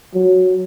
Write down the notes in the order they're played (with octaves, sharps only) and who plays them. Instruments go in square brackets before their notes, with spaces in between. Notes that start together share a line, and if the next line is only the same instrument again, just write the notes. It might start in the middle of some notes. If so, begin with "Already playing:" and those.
[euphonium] F#3